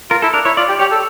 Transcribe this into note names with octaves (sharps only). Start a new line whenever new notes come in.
F4 A#4
E4 A4
D4 A#4
E4 C#5
F4 D5
G4
G4 C#5
A4